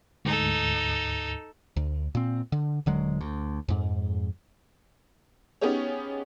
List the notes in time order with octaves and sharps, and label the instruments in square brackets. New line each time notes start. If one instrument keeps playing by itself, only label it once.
[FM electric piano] D2 G#2 [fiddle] D#4 A4
[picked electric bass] D2
A#2 C4
D3
D#1 D3 F#3 G#3
D2
F2 G#2
[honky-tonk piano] B3 C#4 D#4 G4 G#4 C#5